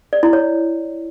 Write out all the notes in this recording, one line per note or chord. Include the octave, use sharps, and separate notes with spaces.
D5
E4
C#5